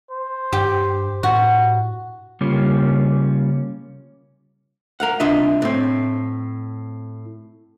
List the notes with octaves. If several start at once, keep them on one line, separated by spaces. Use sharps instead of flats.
C5
G2 G4
A2 F#4
C#3 G3 A#3 C#4 F4 G4
A#4 F5 F#5
C2 C3 D4 F4 D#5 E5
A2 C4